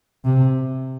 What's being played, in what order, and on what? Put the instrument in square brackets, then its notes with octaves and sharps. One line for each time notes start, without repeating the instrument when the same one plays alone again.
[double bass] C3